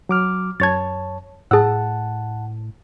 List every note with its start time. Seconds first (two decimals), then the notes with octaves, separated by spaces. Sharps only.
0.09 F#3 D6 F6
0.60 F#2 C#5 A5 G#6 A6
1.51 A2 G#4 F#5 A5 E6